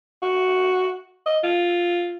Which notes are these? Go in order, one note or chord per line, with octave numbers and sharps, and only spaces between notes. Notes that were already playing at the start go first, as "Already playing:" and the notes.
F#4
D#5
F4